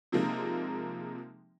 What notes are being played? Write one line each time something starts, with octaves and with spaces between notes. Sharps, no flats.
C3 F3 G#3 A#3 D#4